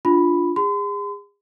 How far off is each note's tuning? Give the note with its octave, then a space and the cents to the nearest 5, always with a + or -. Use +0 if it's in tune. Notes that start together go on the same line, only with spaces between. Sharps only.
D4 +0 F4 +0 B5 +0
G#4 -35 C6 -45